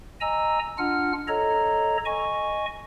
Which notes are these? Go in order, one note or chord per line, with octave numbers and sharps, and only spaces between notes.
D#5 G#5 A#5 E6
D4 F4 F#5 F6
A4 C#5 D#5 A#5
D#5 G#5 C#6